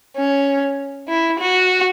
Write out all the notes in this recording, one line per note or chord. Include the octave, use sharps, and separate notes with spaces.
C#4
E4
F#4